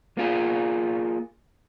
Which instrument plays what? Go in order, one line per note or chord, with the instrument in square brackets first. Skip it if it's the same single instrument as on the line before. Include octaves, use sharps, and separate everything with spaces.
[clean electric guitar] A#3 F4 G#4